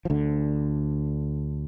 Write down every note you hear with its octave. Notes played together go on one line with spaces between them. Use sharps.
F3
D2 D3